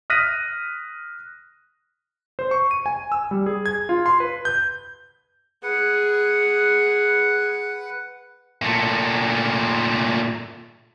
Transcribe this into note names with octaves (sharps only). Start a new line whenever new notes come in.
D#6 F6 F#6 A#6 B6 D#7
C5
C#6
D#7
G#5
E6
G3
G#4
G#6
F4
C6
B4
G6
G#4 B4 F#5
A#2 A3